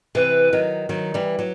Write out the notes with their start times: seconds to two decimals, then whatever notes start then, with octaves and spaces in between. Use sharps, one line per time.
0.15 C3 E3 B4
0.53 D#3 F#3
0.89 D#3 F#3
1.14 E3 G3
1.39 F#3